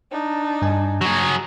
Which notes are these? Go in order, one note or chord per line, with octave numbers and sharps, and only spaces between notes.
D4 D#4
G2 D#5 G#5
F#3 G#4 A#5